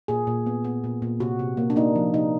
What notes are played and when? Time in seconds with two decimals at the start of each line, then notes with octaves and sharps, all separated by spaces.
0.08 A#2 G#4
0.27 A#2
0.46 B3
0.64 B3
0.84 A#2
1.02 A#2
1.20 C3 F#4
1.39 C3
1.57 A#3
1.70 D4
1.76 A#3 D#4
1.95 F3
2.14 C3 D#4